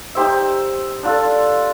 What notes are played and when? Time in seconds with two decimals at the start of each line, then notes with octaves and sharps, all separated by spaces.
0.15 D#4 G4 C5 E5
1.03 D4 F4 A4